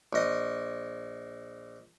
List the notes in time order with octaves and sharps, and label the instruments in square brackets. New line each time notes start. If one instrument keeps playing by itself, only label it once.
[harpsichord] A#1 D#5